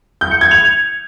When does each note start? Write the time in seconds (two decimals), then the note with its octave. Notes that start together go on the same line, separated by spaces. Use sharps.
0.21 G6
0.31 C#7
0.41 G#6
0.51 F7